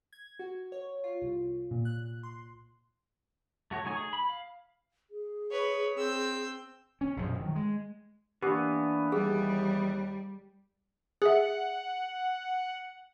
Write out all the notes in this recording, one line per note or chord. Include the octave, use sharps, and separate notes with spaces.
G#6
F#4
C#5
F4
C2
A#2
F#6
C6
A3 F#4 C#5
F#3 A3 D#4 G#5 C#6
G#4
B5
F5
G#4
B4 C#5
C4 E6 G6
C#4
A#1 F#2 B2 F3
D#3 F#3
G#3
E3 A#3 B3 D4 G4
D#2 G3 G#4
G#4 E5 F#5